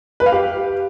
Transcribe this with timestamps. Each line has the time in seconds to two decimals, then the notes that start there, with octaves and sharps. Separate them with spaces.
0.20 B4
0.26 F5
0.32 G4